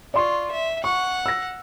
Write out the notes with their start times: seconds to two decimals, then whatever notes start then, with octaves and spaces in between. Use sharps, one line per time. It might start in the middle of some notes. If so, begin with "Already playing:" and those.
0.14 F4 D5 C6 C#6
0.51 E5
0.84 F#5 C#6
1.26 E6 A#6